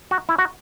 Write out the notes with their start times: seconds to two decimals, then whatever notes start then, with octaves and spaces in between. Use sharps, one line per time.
0.11 F#4
0.29 E4
0.39 F#4